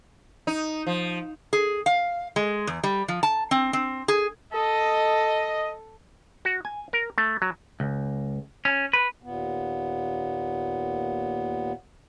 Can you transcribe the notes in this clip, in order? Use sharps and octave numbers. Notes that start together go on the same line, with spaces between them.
D#4
F3
G#4
F5
G#3
E2
G3
F3
A5
C4
C4
G#4
A4 D#5
F#4
G#5
A#4
A3
F#3
C#2
C#4
B4
D#2 A#2 B3